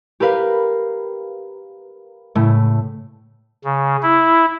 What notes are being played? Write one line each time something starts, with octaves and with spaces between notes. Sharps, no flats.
G4 A#4 B4 F5
A2 C#3 A3
C#3
E4